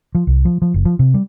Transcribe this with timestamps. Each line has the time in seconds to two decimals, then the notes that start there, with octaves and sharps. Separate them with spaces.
0.15 F3
0.27 C2
0.45 F3
0.62 F3
0.74 F#1
0.85 F3
0.99 C3
1.14 G3